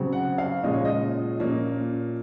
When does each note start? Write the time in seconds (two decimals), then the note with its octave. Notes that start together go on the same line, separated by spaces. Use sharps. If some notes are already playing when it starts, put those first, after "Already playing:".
Already playing: C#3 F#3 C4
0.13 F#5
0.38 F5
0.63 A#2 F3 G#3 C#4 D#5
0.74 C#5
0.85 D#5
1.40 A#2 F3 A#3 C#4